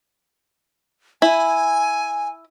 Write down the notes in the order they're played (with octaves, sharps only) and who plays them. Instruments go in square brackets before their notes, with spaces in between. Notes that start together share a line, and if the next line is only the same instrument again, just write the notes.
[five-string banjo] E4 [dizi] G#5